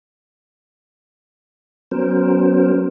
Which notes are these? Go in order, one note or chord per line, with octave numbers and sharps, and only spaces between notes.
F#3 B3 C#4 A#4 C5